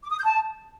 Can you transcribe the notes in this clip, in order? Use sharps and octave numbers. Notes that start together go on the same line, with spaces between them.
D6
D#6
G6
A5